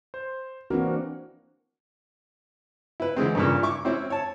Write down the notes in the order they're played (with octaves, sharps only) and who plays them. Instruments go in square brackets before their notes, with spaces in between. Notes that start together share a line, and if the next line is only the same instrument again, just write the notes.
[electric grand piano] C5
[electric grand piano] E3 A#3 A#4 [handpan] C4 D4 F#4
[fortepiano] E4 B4
D3 E3 G#3 C4
G2 A#2 C#3
E4 C#6 D6
C4 C#4 E4
C#5 A5